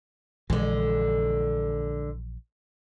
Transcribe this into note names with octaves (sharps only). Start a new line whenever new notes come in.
A#1 D3 E3 G#3